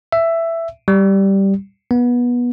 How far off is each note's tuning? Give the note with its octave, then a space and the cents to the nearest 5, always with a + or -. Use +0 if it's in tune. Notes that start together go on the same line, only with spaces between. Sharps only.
E5 +10
G3 -5
B3 -20